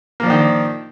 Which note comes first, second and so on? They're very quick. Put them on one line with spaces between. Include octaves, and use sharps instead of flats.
A#3 F3 D4 D#3